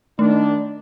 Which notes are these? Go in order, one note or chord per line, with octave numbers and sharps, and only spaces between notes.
D#3 A3 D4